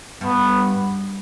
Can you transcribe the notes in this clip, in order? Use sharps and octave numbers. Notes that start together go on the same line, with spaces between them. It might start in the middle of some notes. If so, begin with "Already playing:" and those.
G2 B3